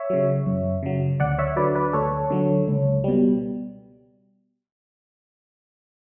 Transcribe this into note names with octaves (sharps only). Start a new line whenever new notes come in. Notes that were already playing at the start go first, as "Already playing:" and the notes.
Already playing: C#5 E5
C#3 F#3
F#2
C#3 F#3
D2 D5 F#5
C#5 E5
D3 F#3 B4 D5
B4 D5
D2 A4 C#5
D3 F#3
C#2
B2 G3